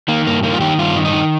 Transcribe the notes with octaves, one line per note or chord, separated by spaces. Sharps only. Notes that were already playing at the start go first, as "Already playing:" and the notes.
D#3 A#3
G2 A#3
D#3 A#3
F4
D#3 G4
G2 F4
D#3
D#4
D#3